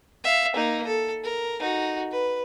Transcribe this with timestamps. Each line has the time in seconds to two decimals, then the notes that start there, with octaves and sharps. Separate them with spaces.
0.24 E5 F5
0.56 A#3 D#4
0.87 A4
1.23 A#4
1.59 D#4 F#4
2.11 B4